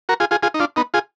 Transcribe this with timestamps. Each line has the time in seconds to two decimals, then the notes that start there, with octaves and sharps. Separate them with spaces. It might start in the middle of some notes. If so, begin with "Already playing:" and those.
0.09 F#4 A#4
0.20 F4 G#4
0.31 F4 G#4
0.43 F4 G#4
0.54 D#4
0.60 D4 F4
0.76 B3 D#4
0.94 F4 G#4